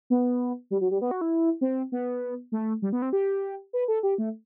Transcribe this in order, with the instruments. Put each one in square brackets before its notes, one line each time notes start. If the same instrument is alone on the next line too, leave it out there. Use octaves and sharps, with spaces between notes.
[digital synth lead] B3
G3
F#3
G3
B3
F#4
E4
C4
B3
A3
G3
B3
C4
G4
B4
A4
G4
A3